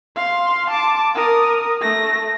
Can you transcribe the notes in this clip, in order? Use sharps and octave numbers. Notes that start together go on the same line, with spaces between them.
F5 C6
A5 D6
A#4 D#6
A3 A#6